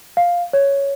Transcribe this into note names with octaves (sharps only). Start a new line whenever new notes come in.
F5
C#5